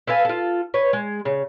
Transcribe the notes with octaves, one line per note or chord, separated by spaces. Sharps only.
A4 B4 F5 G#5
F4 A4
B4 C#5
G#3
C#3